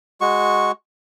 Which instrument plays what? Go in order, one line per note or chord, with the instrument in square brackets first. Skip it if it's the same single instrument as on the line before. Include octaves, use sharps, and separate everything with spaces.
[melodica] G#3 F#4 C#6